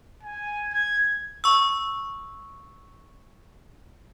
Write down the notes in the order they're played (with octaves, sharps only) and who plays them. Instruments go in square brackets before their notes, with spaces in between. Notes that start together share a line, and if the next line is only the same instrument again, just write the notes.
[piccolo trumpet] G#5
G#6
[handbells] C#6 E6